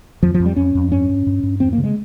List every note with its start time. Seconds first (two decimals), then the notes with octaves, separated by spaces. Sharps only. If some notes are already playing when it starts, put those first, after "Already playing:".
0.22 F2 F3
0.34 F3
0.40 F2
0.45 G3
0.56 F2 C#4
0.75 F2
0.92 G2 C#4
1.09 G2
1.27 G2
1.43 G2
1.60 E2 C4
1.73 A#3
1.78 C#3
1.84 G#3